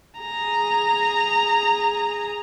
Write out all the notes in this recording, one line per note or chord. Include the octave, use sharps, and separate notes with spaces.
G#4 A#5